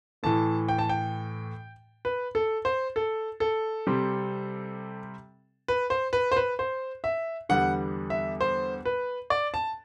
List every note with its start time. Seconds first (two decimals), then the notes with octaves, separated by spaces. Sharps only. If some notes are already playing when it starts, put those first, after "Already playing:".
0.23 A2 E3 A3 A5
0.68 G5
0.79 A5
0.89 G5
2.05 B4
2.35 A4
2.65 C5
2.96 A4
3.40 A4
3.87 C3 G3 C4
5.68 B4
5.90 C5
6.13 B4
6.32 C5
6.37 B4
6.59 C5
7.04 E5
7.49 E2 D3 G3 B3 F#5
8.10 E5
8.41 C5
8.85 B4
9.30 D5
9.54 A5